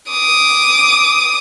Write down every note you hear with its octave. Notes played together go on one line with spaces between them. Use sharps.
D6 D#6